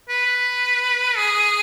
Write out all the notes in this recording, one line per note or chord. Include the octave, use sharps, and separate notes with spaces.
B4
G#4